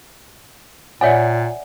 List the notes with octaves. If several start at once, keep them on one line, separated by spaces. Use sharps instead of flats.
A#2 C#5 D5 E5 F#5 G#5